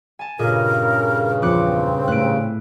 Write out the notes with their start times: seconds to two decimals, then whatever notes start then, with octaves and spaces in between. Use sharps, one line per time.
0.19 G#5 A5
0.39 G2 A#2 C#3 G#4 A#4 D#5
1.42 E2 F3 C4 D6 F#6 C#7
2.08 A2 F#6 D7